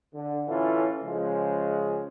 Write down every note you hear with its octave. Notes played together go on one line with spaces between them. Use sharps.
D3
A2 E3 C#4 E4 F4 A4
C#3 F3 G#3